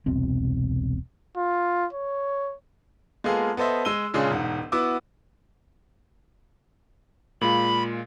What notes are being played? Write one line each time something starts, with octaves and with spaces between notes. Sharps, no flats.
E1 C2 B2 C4
F4
C#5
G#3 A#3 B3 F4 G#4 A4
B3 A4 C5 D#5 E5
G#3 E6 D#7 G7
A#2 C#3 G#3 C#4 D4 G#4
E1 G#2 F#5
B3 E4 F#4 D6 E6
A#2 G#3 F4 B5